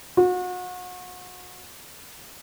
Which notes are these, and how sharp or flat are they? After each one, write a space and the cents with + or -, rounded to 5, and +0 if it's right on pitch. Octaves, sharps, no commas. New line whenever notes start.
F#4 -35